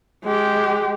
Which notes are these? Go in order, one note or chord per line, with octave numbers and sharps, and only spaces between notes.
G#3 G4